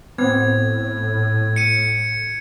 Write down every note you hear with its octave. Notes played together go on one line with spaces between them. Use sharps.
A2 B3 C4 G#6
C#7 D#7